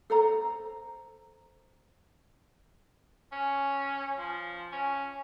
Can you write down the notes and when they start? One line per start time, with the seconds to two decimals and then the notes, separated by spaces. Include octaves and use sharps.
0.10 A4 C5 A#5
3.32 C#4
4.17 F3
4.72 C#4